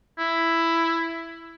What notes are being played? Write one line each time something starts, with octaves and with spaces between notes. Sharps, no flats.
E4